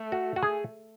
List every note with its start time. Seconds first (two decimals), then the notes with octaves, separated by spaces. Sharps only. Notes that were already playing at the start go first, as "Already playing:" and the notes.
Already playing: A3
0.12 F#4
0.36 F#4
0.43 G#4